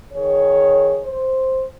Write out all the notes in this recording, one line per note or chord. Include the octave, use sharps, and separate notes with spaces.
D#3 G#4 C#5
C5